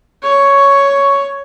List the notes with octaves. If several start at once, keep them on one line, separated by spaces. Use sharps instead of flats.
C#5 C#6